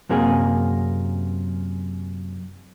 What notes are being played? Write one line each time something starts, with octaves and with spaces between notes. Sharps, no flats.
F#2 C3 A#3 G#4